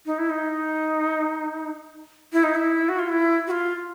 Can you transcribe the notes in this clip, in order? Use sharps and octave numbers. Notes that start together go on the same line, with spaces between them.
D#4
E4
D#4
E4
D#4
E4
F#4
F4
E4
F#4
F4